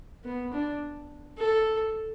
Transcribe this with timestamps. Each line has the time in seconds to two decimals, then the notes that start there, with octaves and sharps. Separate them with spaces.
0.25 B3
0.53 D4
1.38 A4